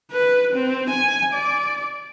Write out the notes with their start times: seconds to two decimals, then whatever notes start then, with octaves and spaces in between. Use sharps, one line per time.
0.12 B4
0.53 C4
0.90 G#5
1.33 D5